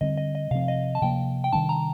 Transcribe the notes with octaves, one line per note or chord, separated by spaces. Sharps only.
D3 G3 C4 D#5
D#5
D#5
C3 F3 C4 F5
D#5
A5
C3 F3 A#3 G5
G5
C3 D#3 G3 D4 A5
A#5